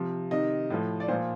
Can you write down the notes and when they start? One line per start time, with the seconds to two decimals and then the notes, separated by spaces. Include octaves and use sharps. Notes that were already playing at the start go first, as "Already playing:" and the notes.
Already playing: C3 F3
0.31 C3 D#3 D#5
0.70 A2 F3
1.00 D5
1.08 A#2 C5
1.12 F3